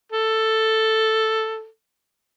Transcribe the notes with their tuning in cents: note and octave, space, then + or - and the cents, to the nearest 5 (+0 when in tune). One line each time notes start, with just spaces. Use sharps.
A4 +5